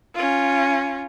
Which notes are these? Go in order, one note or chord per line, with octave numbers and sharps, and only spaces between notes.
C#4 F4